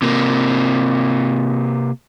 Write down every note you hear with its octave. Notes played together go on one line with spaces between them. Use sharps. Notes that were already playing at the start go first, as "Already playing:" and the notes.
C3 A#3